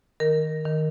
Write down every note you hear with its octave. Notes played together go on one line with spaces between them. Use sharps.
D#3 A#4
D#3